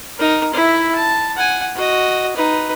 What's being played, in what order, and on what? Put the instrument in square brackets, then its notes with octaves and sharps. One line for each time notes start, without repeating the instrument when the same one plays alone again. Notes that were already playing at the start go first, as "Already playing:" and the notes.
[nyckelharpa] D#4 A#4
E4 E5
A5
F#5 G#5
F#4 D#5
D#4 B4